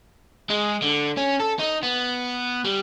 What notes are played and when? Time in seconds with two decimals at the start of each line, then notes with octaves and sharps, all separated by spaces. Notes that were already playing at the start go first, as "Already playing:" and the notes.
0.50 G#3
0.82 D3
1.17 C#4
1.40 A4
1.59 D#4
1.83 B3
2.64 G3